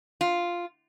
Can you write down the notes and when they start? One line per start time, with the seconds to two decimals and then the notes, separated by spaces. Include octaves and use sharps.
0.21 F4